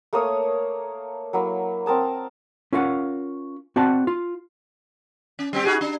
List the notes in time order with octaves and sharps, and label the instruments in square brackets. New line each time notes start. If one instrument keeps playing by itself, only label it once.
[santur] A3 A#3 C#5 D#6
F#3 A#3 E4
C4 A#4 A5 D#6
[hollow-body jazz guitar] C#4 F4 A#4 F5 F#5
C4 F#4 D5 F#5 A5
F4
[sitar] C#4
G3 C4 G4
D#4 F#4 G#4
D4